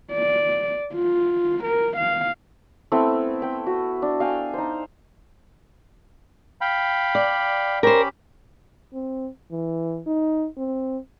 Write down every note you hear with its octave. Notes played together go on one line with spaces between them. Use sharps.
D5
F4
A#4
F5
A3 B3 C4 E4
G5 B5
F#4
D4
F5 G5 G#5
D#4 C5
F5 G5 B5
D5
C#4 G4 A#4 C5 B5
C4
E3
D#4
C4